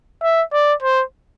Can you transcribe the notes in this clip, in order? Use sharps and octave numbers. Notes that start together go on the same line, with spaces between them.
E5
D5
C5